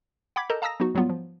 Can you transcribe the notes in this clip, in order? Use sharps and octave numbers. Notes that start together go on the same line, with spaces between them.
F#5 G5 B5 D6 G#6 B6
A4 A#4 D#5 A5 A#5 G6
F5 A5 A#5 D#6 E6 A#6
F#3 B3 D#4 F#4
G#2 F#3 G3 B3 F4
F3